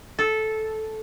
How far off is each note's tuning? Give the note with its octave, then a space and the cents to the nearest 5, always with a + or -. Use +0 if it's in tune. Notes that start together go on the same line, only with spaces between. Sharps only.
A4 -10